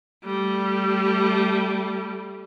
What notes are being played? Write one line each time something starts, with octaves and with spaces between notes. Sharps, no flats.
G3 A3